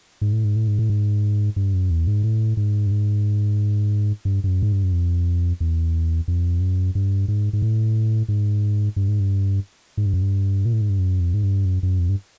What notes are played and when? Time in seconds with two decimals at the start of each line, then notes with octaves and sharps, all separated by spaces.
0.21 G#2
0.33 A2
0.44 G#2
0.56 A2
0.67 G#2
0.79 A2
0.90 G#2
1.56 G2
1.74 F#2
1.90 E2
2.07 G#2
2.23 A2
2.57 G#2
2.87 G2
2.91 G#2
4.25 G2
4.44 G2
4.47 F#2
4.63 G#2
4.72 G2
4.83 F#2
4.93 F2
5.60 E2
6.28 F2
6.60 F#2
6.95 G2
7.28 G#2
7.53 G#2
7.62 A2
8.28 G#2
8.96 G2
9.08 G#2
9.20 G2
9.97 G#2
10.06 G2
10.14 F#2
10.22 G2
10.65 A#2
10.73 A2
10.81 G#2
10.90 G2
10.99 F#2
11.20 F2
11.34 G#2
11.43 G2
11.65 F#2
11.83 F#2
11.99 F2
12.09 G2